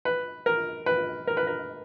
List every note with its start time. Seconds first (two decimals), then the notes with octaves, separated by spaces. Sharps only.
0.05 B4
0.46 A#4
0.86 B4
1.27 A#4
1.37 B4
1.47 A#4